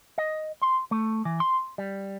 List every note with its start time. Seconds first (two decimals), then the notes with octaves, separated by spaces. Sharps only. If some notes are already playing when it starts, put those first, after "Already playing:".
0.18 D#5
0.62 C6
0.91 A3
1.25 E3
1.40 C6
1.78 G3